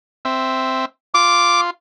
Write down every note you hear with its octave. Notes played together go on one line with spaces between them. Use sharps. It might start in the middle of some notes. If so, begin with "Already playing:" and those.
C4 E5
F4 D6